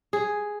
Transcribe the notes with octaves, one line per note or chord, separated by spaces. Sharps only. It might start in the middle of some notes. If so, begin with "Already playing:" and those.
G#4